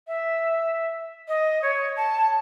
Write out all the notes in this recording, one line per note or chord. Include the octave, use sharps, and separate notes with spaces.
E5
D#5
C#5
A5